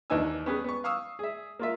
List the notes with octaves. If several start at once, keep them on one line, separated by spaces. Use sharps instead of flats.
D#2 E3 D4 D#4 G#5 E6
B3 C#4 G4 G#4 B4
B3 C#6
F5 C#6 D#6 E6
G#4 E5
A#3 F4 E5